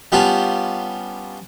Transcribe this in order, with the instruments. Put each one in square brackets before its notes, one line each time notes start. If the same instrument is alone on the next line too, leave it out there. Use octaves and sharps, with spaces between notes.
[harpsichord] G3 B3 C#4 D4 F4 G4